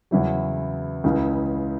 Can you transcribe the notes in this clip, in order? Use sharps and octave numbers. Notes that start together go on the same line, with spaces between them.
E2 C#3 F#3 E4
C#2 C#3 E3